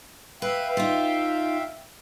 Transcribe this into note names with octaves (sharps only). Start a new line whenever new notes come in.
B4 E5 F5 G5
D#4 F4